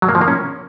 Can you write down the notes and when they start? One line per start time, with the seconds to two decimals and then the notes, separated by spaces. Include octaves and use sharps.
0.02 F#3
0.09 A#3
0.15 F3
0.21 A#3
0.28 C#4